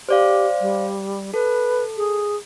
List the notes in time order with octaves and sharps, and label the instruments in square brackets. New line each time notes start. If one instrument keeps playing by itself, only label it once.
[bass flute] G4 [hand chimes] C5 D5 F5
[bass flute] G3
[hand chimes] A4 [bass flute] B4
[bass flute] G#4